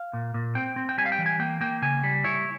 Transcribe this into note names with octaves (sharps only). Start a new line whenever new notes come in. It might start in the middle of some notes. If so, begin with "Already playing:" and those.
Already playing: F5
A#2
A#2
C4 G5
C4
G5
G3 G#5
F5
G5
E3
G#5
A#3 G5
A#3 G5
C#3 G#5
G3
E4 C#5